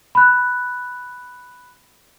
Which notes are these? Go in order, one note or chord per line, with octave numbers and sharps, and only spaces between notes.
B5 F#6